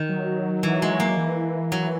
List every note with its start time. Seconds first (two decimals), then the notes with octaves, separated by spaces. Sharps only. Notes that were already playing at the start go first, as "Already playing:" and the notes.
Already playing: D#3
0.09 F#3
0.63 E3
0.82 G#3
1.00 A#3
1.17 E3
1.72 F#3